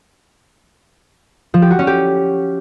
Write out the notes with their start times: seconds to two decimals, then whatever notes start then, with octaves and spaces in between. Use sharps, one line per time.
1.54 F3
1.62 G4
1.71 F#4
1.79 C#4
1.87 G4